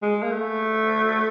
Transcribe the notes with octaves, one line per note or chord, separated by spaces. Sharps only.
G#3
A#3
A3